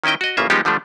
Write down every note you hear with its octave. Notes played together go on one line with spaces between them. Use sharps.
D#3 C#4 E4 D#5 G5
F#4 D#5
A1 C#3 A#3 F4 E5
F3 G3 G#3 B3 D#4 G4
D3 F3 G3 A3 D4